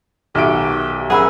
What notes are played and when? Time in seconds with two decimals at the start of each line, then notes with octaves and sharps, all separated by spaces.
0.35 B1 D#3 F#4 G4 E5 D7
1.10 F#3 C#4 G#4 A#4 F#5 B5 E6